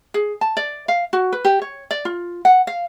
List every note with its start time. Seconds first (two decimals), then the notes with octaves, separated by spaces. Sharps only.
0.14 G#4
0.41 A5
0.57 D5
0.88 F5
1.13 F#4
1.32 B4
1.45 G4
1.62 C#5
1.91 D5
2.05 F4
2.45 F#5
2.67 F5